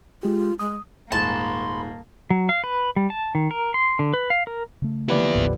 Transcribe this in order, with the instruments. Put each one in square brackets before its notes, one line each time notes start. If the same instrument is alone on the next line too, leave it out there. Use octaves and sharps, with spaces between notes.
[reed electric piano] G#3 G4 [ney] F4
[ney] G#3 [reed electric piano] D#6
[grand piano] D#1 G#2 G#3 [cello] A#3 [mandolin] A5 [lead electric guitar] B5 C6
[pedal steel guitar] F#3
F5
B4
G3
A5
D#3
A#4
C6
D3
B4
F5
A#4
[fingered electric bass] C#3 A3
[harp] D3 F3 A#3 [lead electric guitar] B3 E4 [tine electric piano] G4 B4 D5
[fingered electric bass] A1 D#2 A2